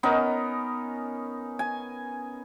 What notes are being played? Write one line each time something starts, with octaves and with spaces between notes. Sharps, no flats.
B3 C#4 D#4 A#4
G#5